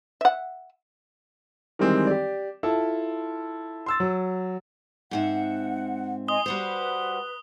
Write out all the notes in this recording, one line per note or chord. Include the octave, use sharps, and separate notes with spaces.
E5 F#5
D#3 E3 G3 G#3 C4
G4 D5
E4 F4 A4 A5
C6 E6 A6
F#3
G#2 C4 E5 F#5
D#5 G#5 C6 D#6 G7
G3 F#4 B4 C5